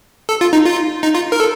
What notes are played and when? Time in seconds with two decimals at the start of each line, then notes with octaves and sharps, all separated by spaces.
0.29 A4
0.41 F4
0.53 D#4
0.65 F4
1.03 D#4
1.15 F4
1.32 A#4
1.40 A4